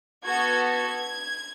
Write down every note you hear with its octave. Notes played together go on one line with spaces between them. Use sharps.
B3 F#4 A4 G#6
G#6